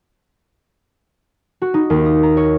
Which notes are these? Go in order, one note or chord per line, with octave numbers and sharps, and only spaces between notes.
F#4
D#4
D#2
D#6
A#5
C#5